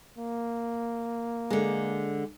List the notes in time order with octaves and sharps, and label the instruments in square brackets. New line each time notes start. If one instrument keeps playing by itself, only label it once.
[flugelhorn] A#3
[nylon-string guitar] D3 G#3